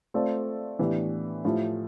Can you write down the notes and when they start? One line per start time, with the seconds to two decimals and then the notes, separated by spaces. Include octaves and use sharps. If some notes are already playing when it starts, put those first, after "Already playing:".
0.14 A3 C4 F4 A4 D5
0.79 A2 E3 B3 D4 G4
1.45 A2 F3 A3 E4 G4